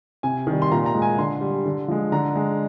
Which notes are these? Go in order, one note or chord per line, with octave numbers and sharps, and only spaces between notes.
C3 G#5
D#3 G3
C6
A#2 A#5
A#5
G#3
G#5
D3 C6
G3
D3
F3 G#3
D3 A#5
G#3